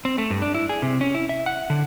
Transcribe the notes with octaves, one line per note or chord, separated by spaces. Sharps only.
C4
A3
G2
D4
E4
G#4
C3
C#4
E4
E5
F#5
D3